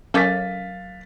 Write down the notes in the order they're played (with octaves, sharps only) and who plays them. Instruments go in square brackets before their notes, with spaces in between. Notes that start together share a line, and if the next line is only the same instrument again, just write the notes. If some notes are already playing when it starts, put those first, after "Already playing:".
[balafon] F#3 A#4 D6 [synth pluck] C#4 A4 [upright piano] F5 A6 B6